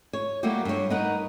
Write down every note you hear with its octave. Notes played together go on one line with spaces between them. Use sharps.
C#5
F#3 G3 A3 A#3 F#4 G4
G2 C#5
D#4 A#4 B4 F#5